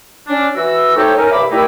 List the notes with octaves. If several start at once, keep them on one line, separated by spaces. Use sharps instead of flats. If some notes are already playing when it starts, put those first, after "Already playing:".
C#4 D4
E3 F#4 E6
A3 C4 D#4 G4 A4 C#5
C#4 D#4 A#4
C2 G2 E5 B5 D6
D#3 G3 A3 D#4 E4